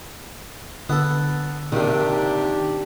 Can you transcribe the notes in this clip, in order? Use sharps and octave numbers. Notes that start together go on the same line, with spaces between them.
D3 B3 A4
A#1 C3 D#3 D4 G4